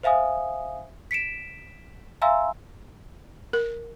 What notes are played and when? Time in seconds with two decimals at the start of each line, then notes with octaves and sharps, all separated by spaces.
0.03 C5 E5 F5 G#5 D#6
1.11 B6 C#7 D7 E7
2.22 E5 F5 G#5 A#5 C6 E6
3.53 A#4